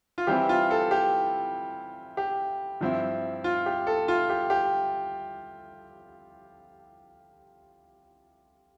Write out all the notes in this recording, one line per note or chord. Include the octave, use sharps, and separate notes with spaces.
F4
E3 G3 C4 E4 G4
F4
A4
G4
G4
G2 F3 C4 E4
F4
G4
A4
F4
G4
G4